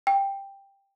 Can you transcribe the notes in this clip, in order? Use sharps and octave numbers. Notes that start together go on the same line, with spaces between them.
G5